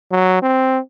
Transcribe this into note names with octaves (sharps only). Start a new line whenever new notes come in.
F#3
C4